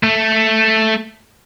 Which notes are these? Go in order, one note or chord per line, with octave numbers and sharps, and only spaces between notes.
A3